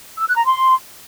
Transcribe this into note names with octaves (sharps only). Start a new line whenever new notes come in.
E6
F#6
A#5
C6